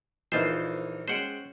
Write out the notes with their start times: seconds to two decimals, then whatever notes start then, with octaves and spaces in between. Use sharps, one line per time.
0.32 A#1 E3 D#4 F4 A#4 C5
1.08 G#3 C#4 C5 F#5 G5